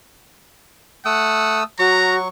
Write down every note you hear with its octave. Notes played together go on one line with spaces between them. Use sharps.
A3 F#5 D#6 E6
F#3 F#4 A#5 C#6